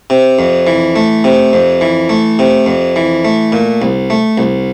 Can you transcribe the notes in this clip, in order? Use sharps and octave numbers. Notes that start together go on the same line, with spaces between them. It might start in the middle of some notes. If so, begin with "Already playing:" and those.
C3
F2
E3
A3
C3
F2
E3
A3
C3
F2
E3
A3
A#2
C2
A3
C2